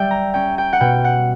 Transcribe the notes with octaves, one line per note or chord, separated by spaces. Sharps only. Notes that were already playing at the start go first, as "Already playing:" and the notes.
Already playing: G3 D5 E5 G5
A#5
C#4 G5
G5
F#5
B2 G5
F#5